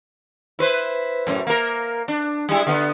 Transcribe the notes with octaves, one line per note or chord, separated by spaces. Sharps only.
E4 B4 C5
F#2 A2
A#3 A#4
D4
G3 G#3 E4
D3 B3